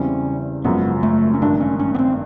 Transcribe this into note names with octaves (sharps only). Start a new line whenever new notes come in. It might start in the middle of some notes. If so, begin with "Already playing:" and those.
Already playing: E2 C#3 E3 G3 C4 C#4
G#1 F#2 C#3 F3 B3
A3
C#4
A1 G2 D#3 D4
C#4
C#4
B3
C4